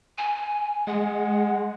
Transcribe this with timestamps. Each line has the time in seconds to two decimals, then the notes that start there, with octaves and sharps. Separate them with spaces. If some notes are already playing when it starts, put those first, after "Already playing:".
0.18 G#5
0.87 G#3 F#5